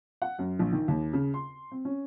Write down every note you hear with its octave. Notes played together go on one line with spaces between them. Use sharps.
F#5
F#2
A#1
D#3
D#2
C#3
C6
C4
C#4